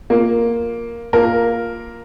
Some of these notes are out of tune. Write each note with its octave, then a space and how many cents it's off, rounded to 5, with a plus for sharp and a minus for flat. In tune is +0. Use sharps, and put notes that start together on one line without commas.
A#3 +0 F4 +5
A#3 +0 F4 +0 A#4 +0